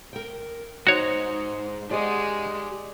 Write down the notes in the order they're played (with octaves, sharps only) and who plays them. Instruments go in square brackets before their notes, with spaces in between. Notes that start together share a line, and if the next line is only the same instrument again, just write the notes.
[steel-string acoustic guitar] A#4 G5
[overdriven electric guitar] G#2 C5 [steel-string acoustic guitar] D#4 [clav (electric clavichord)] F#4 C#5
[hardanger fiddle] G#3 [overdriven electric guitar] G4 F#5 [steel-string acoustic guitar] D5 D#5